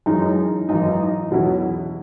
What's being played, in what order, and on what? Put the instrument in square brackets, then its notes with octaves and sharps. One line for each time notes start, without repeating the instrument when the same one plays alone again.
[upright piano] F#2 E3 G#3 C#4 E4 [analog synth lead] D#4
[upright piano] G#1 F#2 E3 [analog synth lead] D#4
[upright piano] E2 B2 F#3 C#4 E4